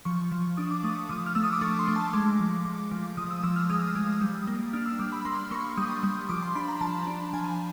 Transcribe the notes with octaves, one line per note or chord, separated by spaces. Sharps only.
F3 C#6
F3
D4 D#6
D6
A3 D#6
F3 D#6
F6
A3 E6
D#6
D6
A3 C#6
C6
A3
A5
G#3 D6
F3
F3 D6
F3
F3 D#6
E6
F3 E6
F6
G#3 D#6
G#3
G3
A#3
D4 F6
E6
G3 D6
B5
A#3 C6
A#3 C#6
G3 D#6
G3
F3 D6
C6
D4 B5
A#5
F3 A5
D4
F3 G#5